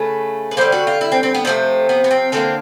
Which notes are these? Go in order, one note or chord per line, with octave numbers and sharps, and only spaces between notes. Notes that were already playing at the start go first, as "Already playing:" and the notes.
Already playing: C#3 A3 B4
B4
D3 G3 A#3 C5
F#4
F4
E4
C4
C4
B3
C3 F3 A3
B3
B3
C4
D3 G3 A#3 C4